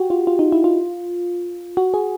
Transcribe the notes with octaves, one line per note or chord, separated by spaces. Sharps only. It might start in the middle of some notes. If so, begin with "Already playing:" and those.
Already playing: F#4 G4
F4
F4
D#4
E4
F4
F#4
G#4